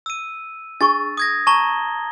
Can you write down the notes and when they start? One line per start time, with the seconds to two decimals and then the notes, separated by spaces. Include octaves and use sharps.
0.06 E6 D#7
0.81 D4 G#4 C#6 A6
1.17 D#6 G#6 A#6
1.47 A5 A#5 C#6 G7